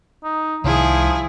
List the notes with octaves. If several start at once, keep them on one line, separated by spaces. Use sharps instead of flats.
D#4
C2 D#3 F3 E4 G#4